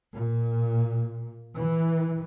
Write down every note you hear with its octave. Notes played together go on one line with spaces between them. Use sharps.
A#2
E3